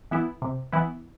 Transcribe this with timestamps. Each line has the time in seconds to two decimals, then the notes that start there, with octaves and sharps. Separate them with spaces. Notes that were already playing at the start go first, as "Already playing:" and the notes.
0.11 E3 B3 E4
0.42 C3
0.72 E3 B3 E4